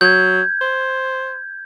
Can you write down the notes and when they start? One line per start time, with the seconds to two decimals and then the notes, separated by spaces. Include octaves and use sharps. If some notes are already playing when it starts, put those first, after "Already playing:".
0.01 F#3 G6 G#6
0.61 C5